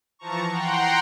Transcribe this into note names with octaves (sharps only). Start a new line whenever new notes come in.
E3 F3 A5 A#5 C#6
F#5 G5 A#5 C6